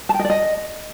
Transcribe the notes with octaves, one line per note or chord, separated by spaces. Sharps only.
A5
G5
D#5
D5
D#5